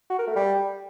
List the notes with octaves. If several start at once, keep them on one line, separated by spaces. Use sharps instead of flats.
F#4
A#4
A3
G3